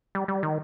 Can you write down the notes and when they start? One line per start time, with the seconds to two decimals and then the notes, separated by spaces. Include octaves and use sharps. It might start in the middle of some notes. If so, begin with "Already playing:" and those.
0.15 G3
0.28 G3
0.43 D#3